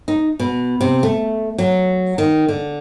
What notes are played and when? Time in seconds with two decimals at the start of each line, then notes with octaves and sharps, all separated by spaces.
0.08 D#4
0.40 B2
0.81 C3
1.03 A3
1.58 F#3
2.18 D#3
2.48 D3